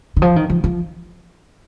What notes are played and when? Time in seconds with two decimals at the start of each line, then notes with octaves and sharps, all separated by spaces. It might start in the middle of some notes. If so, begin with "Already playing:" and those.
0.16 D#3
0.22 F3
0.36 D#3
0.50 F3
0.64 F3